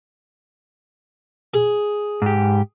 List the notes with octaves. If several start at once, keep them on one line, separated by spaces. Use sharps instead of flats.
G#4
G#2 G4